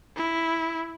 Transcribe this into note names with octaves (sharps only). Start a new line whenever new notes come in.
E4